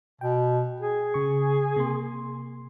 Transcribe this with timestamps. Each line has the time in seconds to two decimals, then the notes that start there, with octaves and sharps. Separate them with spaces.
0.21 B2 G5
0.80 G#4
1.14 C#3 C#6
1.77 C3 A#3 C6